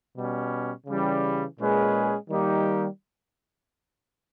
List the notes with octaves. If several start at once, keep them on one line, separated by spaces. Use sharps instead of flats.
B2 G3 C#4
C#3 E3 G3 C#4
A#2 G#3 C#4 G#4 B4
D#3 G3 A#3 D#4 G4